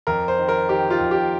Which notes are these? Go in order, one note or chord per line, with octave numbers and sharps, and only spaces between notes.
F2 A#4
C5
D#3
A#4
D#3 G4
F4
F2
G4